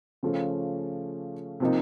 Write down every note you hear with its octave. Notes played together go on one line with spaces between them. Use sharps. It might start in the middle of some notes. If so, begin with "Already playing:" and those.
C#3 F3 A3 C#4
C3 F3 A#3 D#4